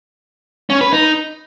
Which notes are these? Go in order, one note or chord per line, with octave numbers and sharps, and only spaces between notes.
C#4
B4
D#4